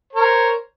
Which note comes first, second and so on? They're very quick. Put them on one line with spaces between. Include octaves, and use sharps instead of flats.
C#5 A#4 C5